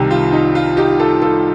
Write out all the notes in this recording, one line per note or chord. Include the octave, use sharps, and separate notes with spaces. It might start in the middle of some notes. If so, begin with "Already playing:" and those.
Already playing: C2 C3 D#3
F4
D#4
F4
D#4 G4
F4 A4
F4 A4